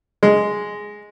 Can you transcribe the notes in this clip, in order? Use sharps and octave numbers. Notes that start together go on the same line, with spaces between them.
G#3